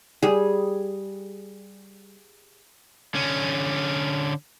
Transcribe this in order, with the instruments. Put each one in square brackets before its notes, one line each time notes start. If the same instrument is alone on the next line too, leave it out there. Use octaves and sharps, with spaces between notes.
[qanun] G3 G#4
[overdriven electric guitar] D3 C#4